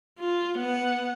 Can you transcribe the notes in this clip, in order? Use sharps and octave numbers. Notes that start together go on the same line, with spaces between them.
F4
B3 F#5